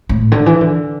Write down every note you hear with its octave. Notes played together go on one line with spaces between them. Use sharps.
A2
D3
E3
D3